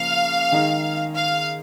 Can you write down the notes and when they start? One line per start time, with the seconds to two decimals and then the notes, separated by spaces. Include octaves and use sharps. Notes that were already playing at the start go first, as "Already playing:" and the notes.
Already playing: C#3 F3 A#3 F5
0.52 D#3 G#3 D#4 G#4
1.15 F5